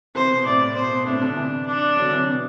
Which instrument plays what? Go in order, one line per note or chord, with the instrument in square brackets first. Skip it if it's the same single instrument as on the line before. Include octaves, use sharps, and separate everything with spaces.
[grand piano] C3 E3 [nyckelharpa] C5
[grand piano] B2
[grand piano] A2 C3 [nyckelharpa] D5
[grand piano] A2
[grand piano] B2 [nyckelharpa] C5
[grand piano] B2
[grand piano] A2 C3 [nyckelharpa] D4
[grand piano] B2 D3
C3 E3
[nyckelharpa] D4
[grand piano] D3 F#3
C3 E3
B2